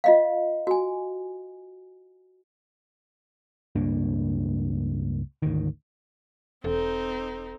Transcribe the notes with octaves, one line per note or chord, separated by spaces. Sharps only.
F4 D#5 F5
F#4 G#5
C#2 G2 A#3 D4
G#1 D2 D#3
E1 C4 D#4 A4